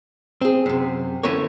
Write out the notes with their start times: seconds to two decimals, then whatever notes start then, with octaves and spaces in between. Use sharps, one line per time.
0.41 C4 G#4
0.66 F#2 C3
1.23 D3 E3 A3 C#4 A#4 C#5